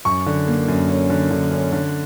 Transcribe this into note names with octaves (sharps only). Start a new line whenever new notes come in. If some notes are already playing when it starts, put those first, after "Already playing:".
F#2 C#6
D3
A#3
F#2
C#4
D3
D3
C#4
D3